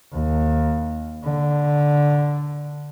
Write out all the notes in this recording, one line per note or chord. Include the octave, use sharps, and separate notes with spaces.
D#2
D3